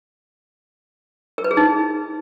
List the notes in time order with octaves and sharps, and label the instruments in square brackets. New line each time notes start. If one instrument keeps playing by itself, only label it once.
[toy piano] A#4
B4
G#4
D#4